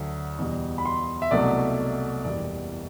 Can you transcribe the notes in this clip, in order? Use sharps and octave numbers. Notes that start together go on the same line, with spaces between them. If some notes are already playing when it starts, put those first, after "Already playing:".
Already playing: D2 D3 F#3
E2 B2 G3
B5
C6
E5
C2 B2 F#3 A3 D5
F#1 E2 B2 G3 D5